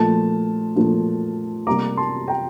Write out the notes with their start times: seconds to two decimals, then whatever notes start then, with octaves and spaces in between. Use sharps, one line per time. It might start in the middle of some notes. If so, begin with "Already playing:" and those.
Already playing: A#2 F3 A3 A5
0.76 A#2 F3 A3
1.67 C3 G3 A#3 A#5 D6
1.97 A5 C6
2.28 G5 A#5